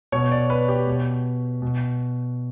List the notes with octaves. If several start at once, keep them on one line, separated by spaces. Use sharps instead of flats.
B2 C#5
D5
B4
G4
B2
B2